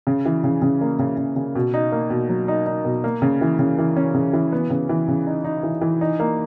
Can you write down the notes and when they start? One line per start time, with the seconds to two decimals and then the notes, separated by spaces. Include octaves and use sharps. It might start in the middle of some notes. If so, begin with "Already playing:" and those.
0.07 C#3
0.26 E3
0.44 C#3
0.62 C#3
0.81 A#3
0.99 C#3
1.17 C#3
1.36 C#3
1.55 B2
1.74 D#4
1.92 A#3
2.10 B2
2.29 F#3
2.48 D#4
2.66 D#4
2.85 B2
3.04 A#3
3.22 C#3
3.41 E3
3.59 C#3
3.78 E3
3.96 C#4
4.15 C#3
4.33 E3
4.52 B3
4.70 C#3
4.89 E3
5.08 C#3
5.26 D#4
5.44 D#4
5.63 E3
5.81 E3
6.01 D#4
6.20 A#3